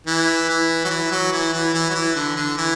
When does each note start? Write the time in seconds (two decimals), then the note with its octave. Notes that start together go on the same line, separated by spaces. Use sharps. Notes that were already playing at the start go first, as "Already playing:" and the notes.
0.07 E3
0.49 E3
0.85 F#3
0.90 E3
1.11 F#3
1.32 E3
1.53 E3
1.74 E3
1.90 F#3
1.94 E3
2.15 D3
2.36 D3
2.58 E3